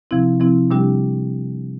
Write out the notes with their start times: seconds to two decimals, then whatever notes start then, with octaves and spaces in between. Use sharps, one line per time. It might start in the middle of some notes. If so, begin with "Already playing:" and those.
0.11 C3 F3 C4 E4
0.40 C3 F3 C4 E4
0.71 C3 G3 D4 G4